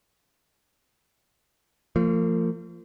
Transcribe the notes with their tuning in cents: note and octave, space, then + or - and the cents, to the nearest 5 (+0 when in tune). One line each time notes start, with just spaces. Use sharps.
F3 -15 A#3 -45